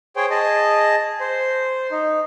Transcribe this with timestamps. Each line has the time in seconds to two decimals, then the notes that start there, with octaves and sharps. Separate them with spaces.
0.16 G#4 C5 C#5 G5
0.30 G#4 D#5 A5
1.21 C5
1.91 D#4